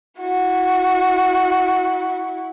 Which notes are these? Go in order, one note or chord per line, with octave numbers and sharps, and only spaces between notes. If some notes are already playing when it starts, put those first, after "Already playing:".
E4 F#4